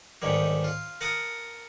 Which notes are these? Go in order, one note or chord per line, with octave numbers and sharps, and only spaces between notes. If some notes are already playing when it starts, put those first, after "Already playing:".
B1 G#2 D3 D#3 G3
F4
A#4 F#5 A5 D#6